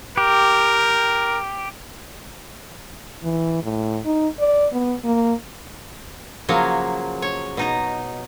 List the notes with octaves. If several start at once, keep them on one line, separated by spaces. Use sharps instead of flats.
G4 A#4
E3
A2
D#4
D5
B3
A#3
C#3 F3 F#3 A#3 C#5
C#5
B2 D#4 A#5